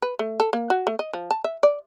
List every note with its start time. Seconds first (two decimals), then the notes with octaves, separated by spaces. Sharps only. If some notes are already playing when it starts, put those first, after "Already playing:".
0.02 B4
0.19 A3
0.40 A4
0.53 A#3
0.70 F#4
0.87 A3
0.99 D#5
1.13 F3
1.31 A5
1.44 E5
1.63 D5